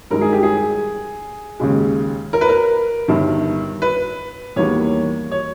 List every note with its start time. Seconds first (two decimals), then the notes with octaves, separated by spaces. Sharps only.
0.11 G2 D#3 G#3 A#4
0.21 G#4
0.33 G4
0.43 G#4
1.60 D#2 C#3 G#3
2.33 A#4
2.41 B4
2.49 A#4
3.08 G1 G2 D#3
3.82 B4
4.56 E2 D#3 G3 A#3 C#5
5.31 C#5